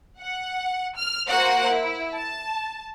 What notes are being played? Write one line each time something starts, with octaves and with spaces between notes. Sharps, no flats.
F#5
F6
A#3 F#4 A#4 C5 F#5
E4
A5